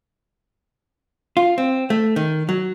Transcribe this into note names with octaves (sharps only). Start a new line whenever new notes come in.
F4
C4
A3
D#3
F#3